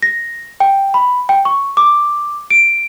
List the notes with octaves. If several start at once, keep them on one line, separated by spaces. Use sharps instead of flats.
A#6
G5
B5
G5
C#6
D6
D7